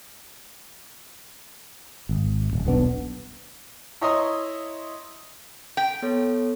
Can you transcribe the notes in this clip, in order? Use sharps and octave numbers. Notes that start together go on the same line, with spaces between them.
G#1
D#1
D#1 B1 B3 D4
E4 C#5 D#5 A#5 C6 D#6
G5
B3 A4 C#5